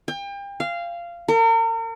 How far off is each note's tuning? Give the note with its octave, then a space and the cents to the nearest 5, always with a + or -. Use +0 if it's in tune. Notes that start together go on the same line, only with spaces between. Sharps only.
G5 +35
F5 -15
A#4 -40